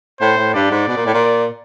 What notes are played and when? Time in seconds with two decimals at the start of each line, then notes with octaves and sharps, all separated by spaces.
0.20 A2 C5
0.37 A2
0.54 G2 D5
0.71 G#2
0.88 B2
0.96 A#2
1.06 A2
1.14 A#2